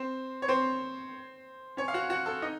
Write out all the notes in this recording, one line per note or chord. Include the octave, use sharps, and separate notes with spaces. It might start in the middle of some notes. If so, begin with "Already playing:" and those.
Already playing: C4 C5
C#5
C4 C5
C#4 C#5
F5
F#4 F#5
F#4 F#5
A4 A5
D#4 D#5